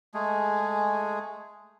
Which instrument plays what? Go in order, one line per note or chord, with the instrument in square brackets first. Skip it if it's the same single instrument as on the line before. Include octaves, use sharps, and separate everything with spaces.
[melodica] G#3 A3 G#4